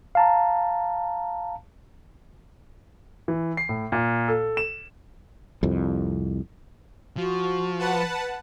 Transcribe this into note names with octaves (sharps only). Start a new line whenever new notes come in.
F5 A5 A#5
E3
C7
A2
A#2
A4
E7
C2 F2
F3 F#4
B4 F#5 A5